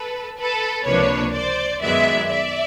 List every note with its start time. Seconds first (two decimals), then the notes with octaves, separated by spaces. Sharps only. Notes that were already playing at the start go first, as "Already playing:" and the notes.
Already playing: A4 B4
0.38 A4 B4
0.86 C#2 C3 F3 A#3 D4 B4 C#5
1.34 C5 D5
1.82 F#2 D#3 G#3 B3 D5 E5
2.30 D5 E5